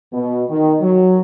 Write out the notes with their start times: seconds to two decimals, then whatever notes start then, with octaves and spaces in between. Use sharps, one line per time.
0.13 B2
0.49 D#3
0.81 F#3